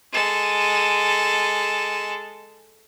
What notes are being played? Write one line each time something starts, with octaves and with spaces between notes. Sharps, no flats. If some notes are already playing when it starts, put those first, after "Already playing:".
G#3 A4